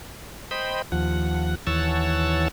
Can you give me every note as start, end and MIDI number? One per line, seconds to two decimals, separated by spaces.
0.51 0.82 72
0.51 0.82 75
0.51 0.82 79
0.51 0.82 83
0.92 1.55 39
0.92 1.55 53
0.92 1.55 78
1.67 2.48 39
1.67 2.48 52
1.67 2.48 73
1.67 2.48 78
1.67 2.48 81
1.67 2.48 88